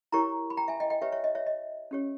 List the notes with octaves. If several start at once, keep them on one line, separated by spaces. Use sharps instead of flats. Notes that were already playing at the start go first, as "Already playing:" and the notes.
E4 G4 A#4 C#5 A#5 C#6
B5
G5 A#5
E5 G#5
D#5 G5
D#5 G5
G4 B4 C#5 E5
C#5 E5
D#5
C#5 E5
D#5
C#4 G4 C#5